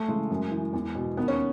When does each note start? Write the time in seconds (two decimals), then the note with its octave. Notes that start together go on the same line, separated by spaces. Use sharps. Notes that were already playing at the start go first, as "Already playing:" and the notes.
Already playing: A3
0.08 C#3 E3 G#3
0.30 F#2
0.51 E3
0.73 E2
0.95 B2
1.17 D#2 B3
1.28 C#4